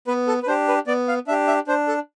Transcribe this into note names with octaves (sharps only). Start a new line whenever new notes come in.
B3 B4
A4
B4
D4 G4 C5
B4
B3 D5
F5
D4 G4 E5
E5
D4 C5
A4